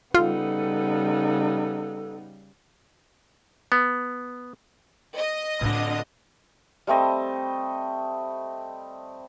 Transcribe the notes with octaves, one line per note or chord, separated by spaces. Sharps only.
C#3 G3 B3 D#4 F4 A4
B3
D#5
C#2 A2 D3 C4
G3 A3 C4 D#5